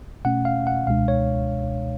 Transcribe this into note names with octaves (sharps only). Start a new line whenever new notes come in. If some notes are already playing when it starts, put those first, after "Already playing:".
B2 A3 C#4 F#5
F5
F#5
C#2 B2 G#3 D4 F5
C#5